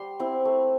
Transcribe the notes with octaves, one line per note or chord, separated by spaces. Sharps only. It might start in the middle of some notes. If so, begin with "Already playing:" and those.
Already playing: G3 C6
C4 E4
A3